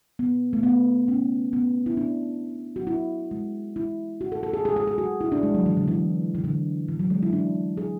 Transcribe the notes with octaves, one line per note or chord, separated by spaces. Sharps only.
B3
A3
B3
C#4
B3
E4
D4
F#4
E4
G#3
E4
F#4
A4
A4
G#4
G#4
G#4
G#4
F#4
E4
D4
G#3
F#3
E3
D3
E3
E3
D3
E3
F#3
G#3
E4
D4
G#4